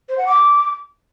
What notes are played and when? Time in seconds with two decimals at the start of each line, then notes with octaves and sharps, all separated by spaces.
0.09 C5
0.18 F#5
0.27 D6